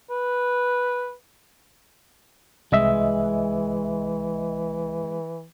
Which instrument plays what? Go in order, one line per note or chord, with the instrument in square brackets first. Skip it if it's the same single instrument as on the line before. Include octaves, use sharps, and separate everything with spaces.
[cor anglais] B4
[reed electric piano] C2 D#5 E5 [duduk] E3 [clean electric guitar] G#3